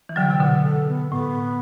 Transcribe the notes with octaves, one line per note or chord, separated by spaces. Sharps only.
E3
D3 F#3 G5
C3 G5
B2 D3 F#5
A4
B3
A2 B3